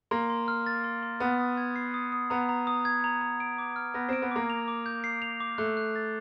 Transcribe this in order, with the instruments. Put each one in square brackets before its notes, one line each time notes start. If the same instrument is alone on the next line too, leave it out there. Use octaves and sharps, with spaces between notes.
[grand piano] A#3 [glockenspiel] C6
[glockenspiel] C6
F6
A6
C6
C6
[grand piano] B3 [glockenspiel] D#6
[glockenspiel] D#6
G#6
C7
D#6
D#6
[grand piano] B3 [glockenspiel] A#5
[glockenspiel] A#5
D#6
G#6
A#5
A#5
D7
D6
F6
[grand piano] B3 [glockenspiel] A#6
[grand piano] C4 [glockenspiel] D7
[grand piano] B3
[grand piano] A#3 [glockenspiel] D6
[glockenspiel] F7
D6
G6
C7
F7
D6
[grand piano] A3 [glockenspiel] F#6
[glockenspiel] F#6
A6